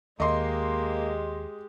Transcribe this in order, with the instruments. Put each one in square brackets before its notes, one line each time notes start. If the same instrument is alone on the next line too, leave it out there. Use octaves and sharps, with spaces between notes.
[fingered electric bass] D#2 [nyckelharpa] G#3 G4 [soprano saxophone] A#3 [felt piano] D#5 C6